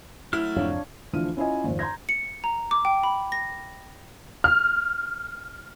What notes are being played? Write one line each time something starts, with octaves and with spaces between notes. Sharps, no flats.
F#3 A3 E4 F6
F2 G#2 C3 D4 C#5 F5
D2 E3 F3 D4 F6 D#7
C#4 E4 F4 C#5 D#5 G#5
G#1 F2
A#5 C6 G6 G#6 A#6
C#7
A#5
D6
G5
B5
A#6
F6